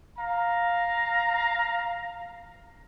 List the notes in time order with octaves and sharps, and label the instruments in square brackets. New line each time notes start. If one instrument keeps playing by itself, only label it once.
[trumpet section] F5 A#5